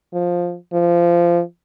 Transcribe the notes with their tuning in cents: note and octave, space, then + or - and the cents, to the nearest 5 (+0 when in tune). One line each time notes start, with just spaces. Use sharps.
F3 +10
F3 -20